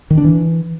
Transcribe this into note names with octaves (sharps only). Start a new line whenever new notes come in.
D#3
D4
E3